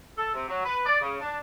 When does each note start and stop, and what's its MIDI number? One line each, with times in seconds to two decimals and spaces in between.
0.18 0.33 69
0.35 0.48 48
0.49 0.62 54
0.66 0.81 71
0.86 1.00 74
1.01 1.17 49
1.21 1.38 62